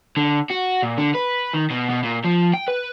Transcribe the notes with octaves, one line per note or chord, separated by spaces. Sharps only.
D3
F#4
A#2
D3
B4
D#3
B2
B2
A#2
F3
G5
B4